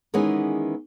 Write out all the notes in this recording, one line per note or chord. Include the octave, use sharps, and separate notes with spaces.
D#3 E3 G#3 B3 C#4 G#4